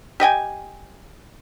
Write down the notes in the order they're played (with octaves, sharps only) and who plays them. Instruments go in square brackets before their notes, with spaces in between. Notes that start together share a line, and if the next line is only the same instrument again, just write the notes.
[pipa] G4 D#5 G5 G#5